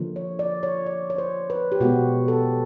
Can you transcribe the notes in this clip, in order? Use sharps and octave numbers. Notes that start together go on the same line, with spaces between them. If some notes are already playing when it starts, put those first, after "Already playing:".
Already playing: D3 F3 A#3
C#5
D5
C#5
D5
C#5
C5
B4
G4
B2 G#3 B3 F#4
A4